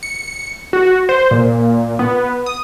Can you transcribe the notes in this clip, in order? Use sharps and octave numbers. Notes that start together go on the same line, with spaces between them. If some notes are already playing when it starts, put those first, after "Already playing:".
C#7
F#4
C5
A#2
B3
D#6